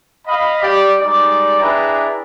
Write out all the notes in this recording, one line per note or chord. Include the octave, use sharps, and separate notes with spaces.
D#5 F5 B5
G4 D5
G3 G#3 D#4 D5
D4 E4 G#4 B4 G5 A#5